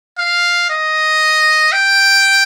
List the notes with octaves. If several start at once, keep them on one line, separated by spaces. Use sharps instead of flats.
F5
D#5
G5